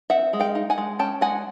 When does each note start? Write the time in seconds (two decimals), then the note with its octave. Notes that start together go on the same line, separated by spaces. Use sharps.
0.10 C4 E5 F#5
0.33 G#3
0.40 F5 G5
0.55 D#4
0.70 F#5 G#5
0.78 G#3
0.99 C#4 G5 A5
1.21 G#3 F#5 G#5